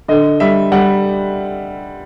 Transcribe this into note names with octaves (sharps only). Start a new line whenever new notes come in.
D3 D#5
G3 E5
G3 F#5